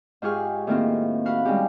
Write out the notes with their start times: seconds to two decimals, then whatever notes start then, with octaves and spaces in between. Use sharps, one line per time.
0.22 G#2 F4 G4 G#4 C#6 F6
0.67 A2 D#3 A#3 C4 F4
1.25 F#4 F5 F#5 B5
1.45 G3 G#3 C4 C#4 D#4 G4